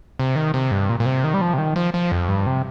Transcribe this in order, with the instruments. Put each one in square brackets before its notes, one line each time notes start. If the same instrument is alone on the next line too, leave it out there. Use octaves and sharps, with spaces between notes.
[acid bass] C3
D#3
C3
G2
A#2
A#2
C3
D#3
G3
F3
C3
D#3
F3
F3
F2
G2
C3